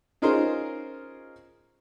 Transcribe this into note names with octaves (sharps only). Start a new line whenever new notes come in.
C#4 D#4 F4 G#4 A#4 C5